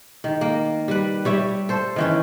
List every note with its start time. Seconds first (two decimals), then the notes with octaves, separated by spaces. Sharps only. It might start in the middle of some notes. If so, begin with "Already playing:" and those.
0.24 D#3
0.41 A#3
0.88 G3 B4
1.25 G3 C#5 E5
1.69 A4 C5
1.96 D#3 E3 C#4